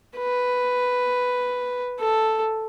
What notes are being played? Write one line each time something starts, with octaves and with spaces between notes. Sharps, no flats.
B4
A4